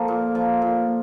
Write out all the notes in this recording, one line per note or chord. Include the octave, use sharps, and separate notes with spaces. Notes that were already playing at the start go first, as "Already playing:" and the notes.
Already playing: F3 A#3 A4
A#2
F3
A#2